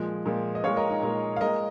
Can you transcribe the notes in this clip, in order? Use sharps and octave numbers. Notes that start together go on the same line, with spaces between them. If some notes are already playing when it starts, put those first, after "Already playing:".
Already playing: A#2 F3 G#3
A#2 F3 G#3
D#5
A#2 G#3 C#5 F5
A#4 D#5
D#4
A#2 G#3 D#4
F5
A#2 G#3 A#4 D#5